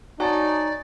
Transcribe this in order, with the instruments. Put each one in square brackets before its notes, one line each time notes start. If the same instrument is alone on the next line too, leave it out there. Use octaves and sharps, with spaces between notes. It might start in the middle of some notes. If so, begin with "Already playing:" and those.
[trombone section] D#4 [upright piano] F#4 A5 [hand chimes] C#5 G#5 C#6 [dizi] D5